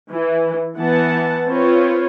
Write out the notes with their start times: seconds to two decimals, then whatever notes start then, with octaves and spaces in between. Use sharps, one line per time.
0.10 E3
0.77 E3 B3 F#5 A5
1.48 C4 F4 B4 C#5